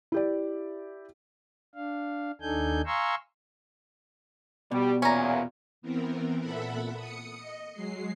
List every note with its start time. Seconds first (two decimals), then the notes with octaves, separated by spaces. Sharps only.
0.12 E4 G4 D5
1.75 D4 F5
2.41 D#2 D4 D#4 A4 G#5 G6
2.86 F5 G#5 A#5 C6 C#6 E6
4.72 B2 G3
5.02 E2 A#2 C#4 A#5
5.82 E3 B3 C4 A#4
6.39 A#2 A4 E5 F#5 B5
6.95 D#6 C#7
7.38 D#5
7.73 F#3 G#3 C7